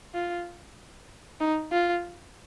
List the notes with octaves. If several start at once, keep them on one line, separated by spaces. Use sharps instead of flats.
F4
D#4
F4